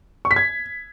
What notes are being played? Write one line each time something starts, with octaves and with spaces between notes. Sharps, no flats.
C#6
B6
G#6